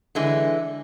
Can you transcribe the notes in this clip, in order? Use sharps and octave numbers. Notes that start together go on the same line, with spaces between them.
D3 E3 G#3